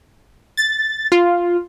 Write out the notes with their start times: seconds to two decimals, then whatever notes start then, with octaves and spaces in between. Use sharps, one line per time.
0.57 A6
1.12 F4